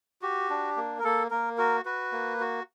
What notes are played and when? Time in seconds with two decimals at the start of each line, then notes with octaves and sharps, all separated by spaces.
0.22 F#4 G4
0.50 D4
0.77 A#3
0.99 A#4
1.04 A#3 A4
1.30 A#3 A#4
1.58 F#4 A#4
1.85 F#4 B4
2.12 A#3
2.40 F#4